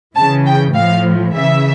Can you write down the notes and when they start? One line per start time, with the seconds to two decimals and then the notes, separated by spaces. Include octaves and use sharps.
0.16 C#3 E3 A5
0.46 G5
0.75 A2 F3 F5
1.34 C#3 E3 E5